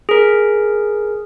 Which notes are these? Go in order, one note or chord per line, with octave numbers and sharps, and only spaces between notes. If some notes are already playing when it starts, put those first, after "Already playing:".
G#4 A#4